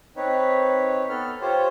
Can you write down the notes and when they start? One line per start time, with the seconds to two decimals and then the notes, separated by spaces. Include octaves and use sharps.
0.17 C4 D#4 B4 C#5
1.09 B3 A4 F6
1.41 F4 G4 C5 C#5